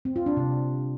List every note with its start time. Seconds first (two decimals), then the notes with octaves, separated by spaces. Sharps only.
0.05 C4
0.16 F4
0.26 D4
0.37 C3